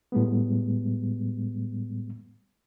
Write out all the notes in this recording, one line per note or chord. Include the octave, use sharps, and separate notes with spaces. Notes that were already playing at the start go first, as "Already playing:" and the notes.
A2 G3 G#3 B3